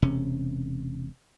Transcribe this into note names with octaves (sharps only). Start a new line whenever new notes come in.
E1 C3 C#4